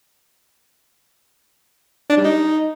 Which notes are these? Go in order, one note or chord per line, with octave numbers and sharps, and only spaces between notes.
D4
G3
D#4